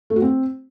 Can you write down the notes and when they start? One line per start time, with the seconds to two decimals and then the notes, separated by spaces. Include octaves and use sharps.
0.10 A3
0.16 F#4
0.22 C4